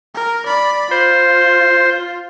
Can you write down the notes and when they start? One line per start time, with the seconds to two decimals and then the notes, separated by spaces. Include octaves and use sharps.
0.15 A#4
0.46 D5 B5
0.91 F4 C5